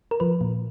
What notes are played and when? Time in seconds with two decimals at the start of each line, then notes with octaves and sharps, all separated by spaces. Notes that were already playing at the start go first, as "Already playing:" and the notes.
0.11 A#4
0.20 F3 B4
0.41 A#2